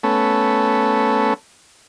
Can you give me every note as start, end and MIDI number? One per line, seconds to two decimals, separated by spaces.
0.03 1.34 57
0.03 1.34 59
0.03 1.34 61
0.03 1.34 69